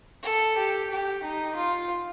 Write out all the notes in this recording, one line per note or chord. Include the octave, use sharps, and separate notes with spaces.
A4
G4
G4
D#4
F4